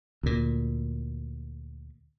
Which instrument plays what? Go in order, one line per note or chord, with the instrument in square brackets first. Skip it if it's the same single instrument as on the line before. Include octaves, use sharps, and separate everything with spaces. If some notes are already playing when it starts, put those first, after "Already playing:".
[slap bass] D2 A#2